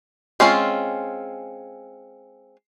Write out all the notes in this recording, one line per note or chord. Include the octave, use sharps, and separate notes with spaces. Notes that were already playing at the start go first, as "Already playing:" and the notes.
G#3 C4 C#4 F4